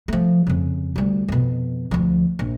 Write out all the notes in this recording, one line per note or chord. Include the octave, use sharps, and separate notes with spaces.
F3 A3
F2 C#3
D2 G3
F2 B2
D2 F3
A#1